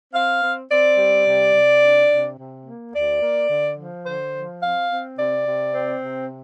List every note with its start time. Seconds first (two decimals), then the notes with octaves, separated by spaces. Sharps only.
0.14 C4 F5
0.42 C4
0.70 C4 D5
0.98 G3
1.26 C3
1.54 C3
1.81 D4
2.10 C3
2.38 C3
2.65 A#3
2.93 D2 D5
3.22 A#3
3.50 D3
3.78 F3
4.06 D3 C5
4.34 F3
4.62 C4 F5
4.90 C4
5.18 C3 D5
5.46 C3
5.74 C4
6.01 C3